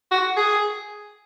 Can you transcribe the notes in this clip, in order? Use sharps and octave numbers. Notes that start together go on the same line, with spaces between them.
F#4
G#4